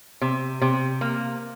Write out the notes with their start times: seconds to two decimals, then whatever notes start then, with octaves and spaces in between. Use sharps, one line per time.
0.21 C3
0.62 C3
1.01 A#3